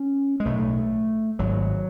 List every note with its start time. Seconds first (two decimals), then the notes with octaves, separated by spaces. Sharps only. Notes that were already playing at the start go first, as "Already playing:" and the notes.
Already playing: C#4
0.40 G#3
0.45 B1 A2 A3
1.39 G#1 G#2 F#3